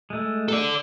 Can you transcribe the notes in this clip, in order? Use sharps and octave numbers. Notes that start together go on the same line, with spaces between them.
G#3 A3
A4 D5